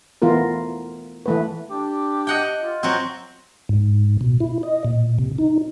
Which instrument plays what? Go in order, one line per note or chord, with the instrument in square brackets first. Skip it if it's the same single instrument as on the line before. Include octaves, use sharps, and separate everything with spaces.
[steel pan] E3 A3 B3 F4 A#4
E3 A3 B4
[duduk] D4 [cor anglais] G4
[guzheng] D#5 F#5 G5
[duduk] F4
[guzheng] F#3 C4 [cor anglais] F#4
[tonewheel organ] G#2
B2
E4
D#5
A#2
C3
D#4